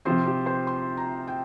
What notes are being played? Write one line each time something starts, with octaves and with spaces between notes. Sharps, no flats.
C3 F3 C4 C5
G4
C5
C6
A#5
G5